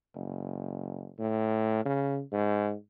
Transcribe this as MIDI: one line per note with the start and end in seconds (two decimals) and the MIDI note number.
0.15 1.10 30
1.19 1.83 45
1.85 2.20 49
2.32 2.73 44